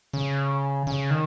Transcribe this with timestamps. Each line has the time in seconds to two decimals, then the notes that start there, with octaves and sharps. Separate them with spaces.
0.13 C#3
0.87 C#3
1.10 D#3